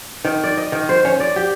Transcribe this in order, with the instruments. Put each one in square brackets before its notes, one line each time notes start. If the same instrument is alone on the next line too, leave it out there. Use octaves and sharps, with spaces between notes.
[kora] D#3
D5
D#5
D#3
C5
C#4
D5
G4